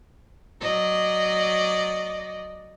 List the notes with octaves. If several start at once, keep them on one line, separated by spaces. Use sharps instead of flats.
F#3 D5 D#5